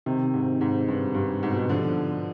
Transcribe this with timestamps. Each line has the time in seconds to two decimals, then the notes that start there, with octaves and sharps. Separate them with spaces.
0.06 C3 D#3
0.34 G#2
0.61 G#2
0.88 G2
1.15 G2
1.43 G#2
1.51 B2
1.58 G#2
1.69 D3 F3